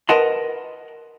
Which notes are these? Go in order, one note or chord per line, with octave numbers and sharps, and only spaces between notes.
A#4 B4 D#5 F#5 A5 C6